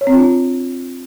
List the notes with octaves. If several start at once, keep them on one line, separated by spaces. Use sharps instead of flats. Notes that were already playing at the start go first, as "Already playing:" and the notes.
C#5
C4
F4
D4